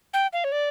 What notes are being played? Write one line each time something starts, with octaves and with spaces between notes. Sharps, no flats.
G5
F5
C#5
D5